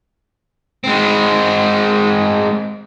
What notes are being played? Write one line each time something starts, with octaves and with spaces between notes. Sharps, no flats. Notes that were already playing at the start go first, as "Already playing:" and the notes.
G#3 C4